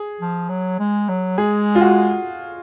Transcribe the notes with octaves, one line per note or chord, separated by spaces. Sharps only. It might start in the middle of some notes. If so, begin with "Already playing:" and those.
Already playing: G#4
F3
F#3
G#3
F#3
G#3 G#4
F4
F#4